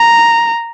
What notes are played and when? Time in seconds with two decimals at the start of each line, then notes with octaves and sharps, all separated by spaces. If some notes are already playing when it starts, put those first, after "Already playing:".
Already playing: A#5